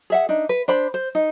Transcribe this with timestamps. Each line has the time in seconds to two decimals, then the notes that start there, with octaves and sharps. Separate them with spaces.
0.10 G#4 E5 F#5
0.29 D4 D#4
0.49 B4
0.68 D4 C5 B5
0.94 C5
1.15 D#4